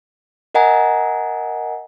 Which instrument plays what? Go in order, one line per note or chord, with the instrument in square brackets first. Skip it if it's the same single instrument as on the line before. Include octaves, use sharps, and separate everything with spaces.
[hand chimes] A#4 D#5 F#5 G#5 A#5